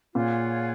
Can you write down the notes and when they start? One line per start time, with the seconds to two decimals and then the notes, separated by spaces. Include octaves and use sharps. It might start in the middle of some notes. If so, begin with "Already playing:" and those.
0.14 A#2 F4 G#4 C#5 F#5